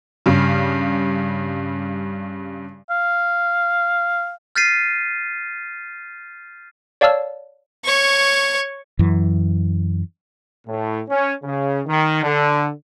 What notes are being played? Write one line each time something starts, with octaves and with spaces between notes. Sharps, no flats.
G2 C#3
F5
F6 G6 A6 B6 C7 D#7
C#5 D5 F5 A5 E6 F6
C#5 C#6
F#2 E3
A2
C#4
C#3
D#3
D3